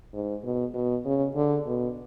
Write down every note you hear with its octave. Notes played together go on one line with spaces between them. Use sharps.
G#2
B2
B2
C#3
D3
B2